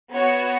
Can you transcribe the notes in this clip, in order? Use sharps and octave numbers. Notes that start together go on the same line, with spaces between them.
B3 F#4 C#5